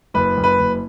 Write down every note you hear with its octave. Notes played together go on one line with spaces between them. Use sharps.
F#1 B4
F#1
B4
F#1